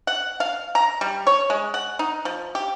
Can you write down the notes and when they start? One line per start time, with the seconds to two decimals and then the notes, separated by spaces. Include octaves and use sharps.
0.07 F#5
0.40 F5
0.75 A#5
1.01 G3
1.27 C#5
1.50 G#3
1.74 F#5
1.99 D#4
2.25 F3
2.55 G4